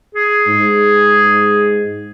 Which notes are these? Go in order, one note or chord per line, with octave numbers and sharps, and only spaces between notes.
G#4
G#2